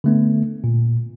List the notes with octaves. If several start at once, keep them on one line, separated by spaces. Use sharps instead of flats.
D3 A3 B3
A#2